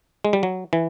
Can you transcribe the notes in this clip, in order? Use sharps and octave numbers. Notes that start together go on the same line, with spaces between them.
G#3
G3
F#3
E3